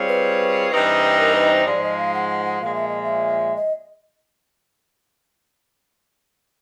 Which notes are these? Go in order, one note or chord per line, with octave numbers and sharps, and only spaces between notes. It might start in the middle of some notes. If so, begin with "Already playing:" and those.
Already playing: G3 C4 F4 G#4 C#5
B4
G2 E3 G3 C4 D#4 B4
B4
B4
A#4
B4
C5
G#2 F3 G#3 D5
D#5
F5
F#5
F#5
F#5
A#2 F3 G#3 F5
E5
D#5
E5
D#5